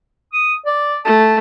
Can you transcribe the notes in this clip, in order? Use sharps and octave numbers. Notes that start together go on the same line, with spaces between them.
D#6
D5
A3 A5